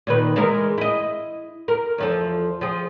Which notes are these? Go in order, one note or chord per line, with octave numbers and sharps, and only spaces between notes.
A#2 D#3 B4
E3 G#3 A#4
E4 D#5
A#4
E2 F3 A4
F3 G#4